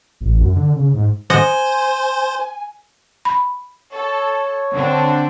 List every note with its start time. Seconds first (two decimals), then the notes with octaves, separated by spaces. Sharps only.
0.21 A1
0.41 F#2
0.56 D3
0.76 C#3
0.94 G#2
1.30 C5 D#5 F#5 G#5
3.25 B5
3.93 A4 C#5
4.73 D3 C4 D4